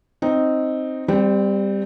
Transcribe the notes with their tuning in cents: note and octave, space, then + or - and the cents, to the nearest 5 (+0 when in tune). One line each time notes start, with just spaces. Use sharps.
C4 +5 D#4 +0
G3 +15 C4 -15